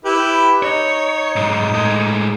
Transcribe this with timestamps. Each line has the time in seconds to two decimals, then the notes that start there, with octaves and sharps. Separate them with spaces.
0.05 E4 G4 B4
0.63 D#4 C#5
1.36 B1 G#2
1.74 A2 G#3